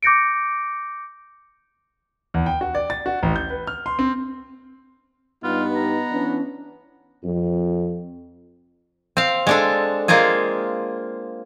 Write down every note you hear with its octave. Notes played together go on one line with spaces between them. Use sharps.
D6 G6 A#6 C#7 D7
E2
G5
F#4
D5
A6
F#4
A1
G6
B4
F6
C6
C4
G2 G3 B3 D#4 F4
A#5
E3 C#4 D4
F2
C4 F5
G#3 D4 A4
G#3 A#3 C4 F4 G#4